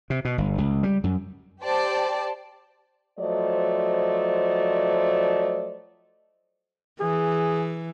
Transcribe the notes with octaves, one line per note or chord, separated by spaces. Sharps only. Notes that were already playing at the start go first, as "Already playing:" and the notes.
C3
B2
G1
C#2
G3
F#2
G4 C5 D5 G5 A5
F3 F#3 A3 C5 D5 D#5
E3 G#4